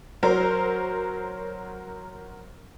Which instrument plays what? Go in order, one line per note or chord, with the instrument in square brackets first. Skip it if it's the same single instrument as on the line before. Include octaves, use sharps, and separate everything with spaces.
[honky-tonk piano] F#3 A#4 C5